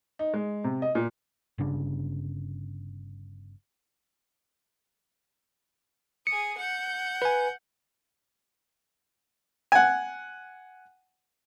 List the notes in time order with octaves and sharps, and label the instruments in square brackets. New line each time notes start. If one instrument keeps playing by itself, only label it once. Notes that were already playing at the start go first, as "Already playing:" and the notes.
[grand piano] D#4
G#3
C3
D#5
A#2
[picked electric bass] G1 C#3 D4
[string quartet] G#4 D#6 [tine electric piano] C#7
[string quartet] F#5 G6
[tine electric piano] B4 G#5
[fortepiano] F#5 G#5